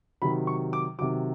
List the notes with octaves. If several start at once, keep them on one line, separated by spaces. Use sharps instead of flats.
C3 D#3 F#3 B5
C#6
D6
C3 D#3 F#3 D6